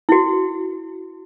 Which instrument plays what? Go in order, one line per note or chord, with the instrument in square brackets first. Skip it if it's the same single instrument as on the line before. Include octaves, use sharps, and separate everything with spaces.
[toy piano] E4 F#4